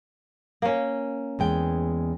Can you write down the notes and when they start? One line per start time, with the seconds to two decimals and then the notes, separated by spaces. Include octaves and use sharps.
0.62 A#3 C#4
1.39 E2 G#3 G5